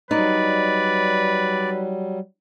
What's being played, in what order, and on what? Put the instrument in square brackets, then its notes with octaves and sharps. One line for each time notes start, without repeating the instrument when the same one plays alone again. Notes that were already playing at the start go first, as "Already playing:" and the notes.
[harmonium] F#3 G3 [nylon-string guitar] D#4 [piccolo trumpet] B4 [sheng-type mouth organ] D5